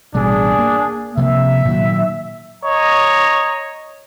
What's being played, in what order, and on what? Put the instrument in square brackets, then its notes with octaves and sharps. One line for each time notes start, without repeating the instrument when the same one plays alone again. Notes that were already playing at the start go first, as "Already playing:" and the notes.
[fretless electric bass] A1 B2 G3 [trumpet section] D4 G#4
[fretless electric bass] A#3
[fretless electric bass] C3 F3 A#3 [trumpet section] E5
[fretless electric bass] A#2 D#3 F#3
[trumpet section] C#5 D#5 A#5